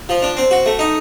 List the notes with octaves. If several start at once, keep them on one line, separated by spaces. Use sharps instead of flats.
F3
D4
C4
F#4
A3
D#4